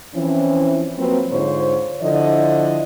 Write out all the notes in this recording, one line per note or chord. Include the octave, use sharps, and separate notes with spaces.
E3 F3 C4 C#4 E4
F3 F#3 A#3 C4 B4
G#2 D3 F4 C5 C#5
D3 F3 E4 D5 D#5